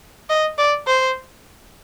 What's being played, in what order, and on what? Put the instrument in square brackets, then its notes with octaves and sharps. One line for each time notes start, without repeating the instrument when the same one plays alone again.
[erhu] D#5
D5
C5